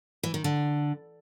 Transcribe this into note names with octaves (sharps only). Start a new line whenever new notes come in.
E3
D#3
D3